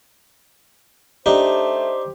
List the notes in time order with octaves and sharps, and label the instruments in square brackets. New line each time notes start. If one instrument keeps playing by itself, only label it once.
[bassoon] A3 [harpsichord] D4 D#4 [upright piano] G4 [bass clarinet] C5